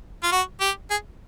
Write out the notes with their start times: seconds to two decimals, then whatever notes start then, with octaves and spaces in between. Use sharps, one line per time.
0.23 F4
0.32 F#4
0.61 G4
0.91 G#4